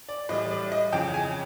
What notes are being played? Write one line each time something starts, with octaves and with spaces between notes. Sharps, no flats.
D5
A2 E3 G3 D#5
D5
D#5
F2 C#3 E3 G5
G#5